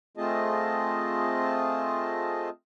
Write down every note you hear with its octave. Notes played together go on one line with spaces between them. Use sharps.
A3 C4 F4 G#4 D#5 A5